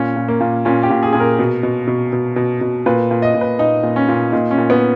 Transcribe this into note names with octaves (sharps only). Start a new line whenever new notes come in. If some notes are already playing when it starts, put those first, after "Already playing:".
Already playing: A#2 C#4
A#2
A#3
A#2
A#2 C#4
G4
A#2
G#4
A#2 G#4
A#4
B2
B2
B2
B2
B2
B2
A#2 B4
A#2
D#5
A#2
B4
A#2 D#4
A#2
C#4
A#2
A#2 D#4
C#4
A#2
B3